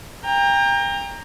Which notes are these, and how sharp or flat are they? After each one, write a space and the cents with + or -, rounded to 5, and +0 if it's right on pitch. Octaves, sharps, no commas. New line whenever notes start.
G5 +30 A#5 +0